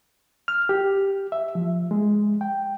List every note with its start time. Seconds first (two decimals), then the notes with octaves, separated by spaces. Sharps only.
0.48 F6
0.69 G4
1.32 E5
1.55 F3
1.91 G#3
2.41 G5